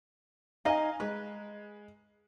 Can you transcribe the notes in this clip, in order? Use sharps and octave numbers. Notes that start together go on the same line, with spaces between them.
D#4 D#5 F5 G#5
G#3 B4